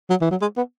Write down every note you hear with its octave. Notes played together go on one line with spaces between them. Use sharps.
F#3
E3
F#3
G#3
B3